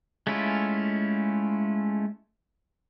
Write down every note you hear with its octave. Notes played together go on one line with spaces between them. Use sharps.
G#3 A3 C#4 E4 F4